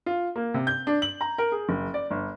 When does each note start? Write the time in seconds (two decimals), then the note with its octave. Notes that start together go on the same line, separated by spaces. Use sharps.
0.06 F4
0.36 A#3
0.54 C3
0.67 G6
0.87 D4
1.02 F#7
1.21 A#5
1.38 A#4
1.52 G#4
1.69 F#1
1.94 D5
2.11 G1